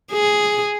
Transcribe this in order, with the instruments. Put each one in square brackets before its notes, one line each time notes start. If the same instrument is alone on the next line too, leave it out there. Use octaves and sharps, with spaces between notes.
[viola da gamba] G#4